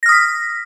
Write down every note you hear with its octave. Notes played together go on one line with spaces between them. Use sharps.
D#6 F6 A#6 B6